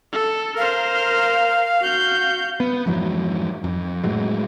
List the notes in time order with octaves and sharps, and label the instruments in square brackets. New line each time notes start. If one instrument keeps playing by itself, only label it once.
[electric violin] A4
[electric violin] A#4 C5 [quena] F5
[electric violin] F#4 G6
[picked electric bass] B3
F2 G#2 E3 F#3
F2
A2 F#3 G#3